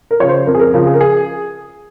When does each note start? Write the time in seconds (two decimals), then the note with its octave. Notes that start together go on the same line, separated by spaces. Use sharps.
0.11 A#4
0.20 C#3 F3 C#5
0.29 C5
0.46 F2 A#4
0.55 G#4
0.59 A#4
0.74 C#3 F3 A#4
0.87 G#4
0.94 A#4
1.01 G#4